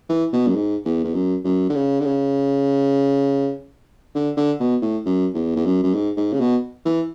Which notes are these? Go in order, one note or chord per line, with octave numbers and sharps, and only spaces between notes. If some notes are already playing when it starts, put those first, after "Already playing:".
E3
B2
F#2
G#2
E2
E2
F#2
F#2
D3
C#3
D3
C#3
D3
D3
B2
A2
F#2
E2
E2
F#2
F#2
G#2
G#2
C#3
B2
E3